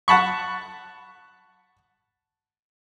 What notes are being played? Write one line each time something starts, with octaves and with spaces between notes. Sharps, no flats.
F#5 A5 B5 C#6